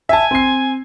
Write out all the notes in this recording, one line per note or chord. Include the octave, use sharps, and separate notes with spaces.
E5 G#5 A5
C4 C7